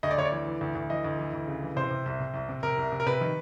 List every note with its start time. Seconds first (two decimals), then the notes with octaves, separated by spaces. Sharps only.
0.03 D2 D#5
0.11 D5
0.18 D2 C#5
0.25 D5
0.32 E3
0.47 E3
0.61 D2
0.75 D2
0.90 E3 D#5
1.04 D2
1.19 E3
1.33 D2
1.48 C#3
1.62 E3
1.76 C3 C5
1.91 C3
2.06 C2
2.20 C3
2.34 C2
2.49 C3
2.63 C3 A#4
2.78 C2
2.92 C3
3.00 A#4
3.06 C3 B4
3.21 D#3